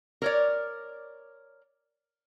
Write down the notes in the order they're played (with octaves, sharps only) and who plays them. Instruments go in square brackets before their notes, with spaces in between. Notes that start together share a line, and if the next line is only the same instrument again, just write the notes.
[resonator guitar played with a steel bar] A#4 C#5 D5